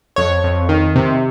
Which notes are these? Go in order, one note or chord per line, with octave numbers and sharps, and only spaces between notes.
F2 C#5
F2
D#3
C3